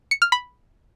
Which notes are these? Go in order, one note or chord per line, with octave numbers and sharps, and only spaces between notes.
C#7
F6
B5